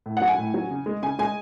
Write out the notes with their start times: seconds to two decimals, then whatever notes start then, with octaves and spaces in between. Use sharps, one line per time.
0.06 A2
0.17 F#3 F#5
0.28 G#5
0.38 A2
0.54 F#3
0.71 C#3
0.86 G#3
1.02 C#3 G#5
1.19 G#3 G#5